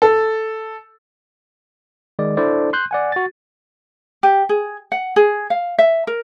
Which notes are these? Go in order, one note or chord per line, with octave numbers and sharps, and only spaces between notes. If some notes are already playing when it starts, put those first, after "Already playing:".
A4
D#3 G#3 D5
D4 E4 A4 C5 D5
C6 F#6 G6
D5 F#5 G#5
F#4 A6
G4
G#4
F#5
G#4
F5
E5
A#4